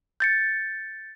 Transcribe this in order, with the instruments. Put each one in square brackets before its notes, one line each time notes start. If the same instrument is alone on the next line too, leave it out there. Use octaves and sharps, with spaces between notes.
[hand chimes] G6 A6 C#7